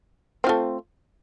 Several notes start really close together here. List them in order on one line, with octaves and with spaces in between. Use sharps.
C4 F4 A3